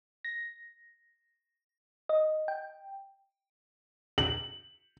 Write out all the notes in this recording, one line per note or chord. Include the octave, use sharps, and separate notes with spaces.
A#6
D#5
G5
F#7